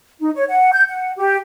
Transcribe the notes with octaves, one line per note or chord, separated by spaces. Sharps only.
D#4
C#5
F#5
G6
F#5
G4